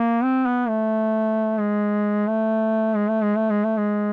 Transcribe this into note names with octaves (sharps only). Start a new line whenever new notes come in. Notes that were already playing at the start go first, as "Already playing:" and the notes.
Already playing: A#3
C4
B3
A3
G#3
A3
G#3
A3
G#3
A3
G#3
A3
G#3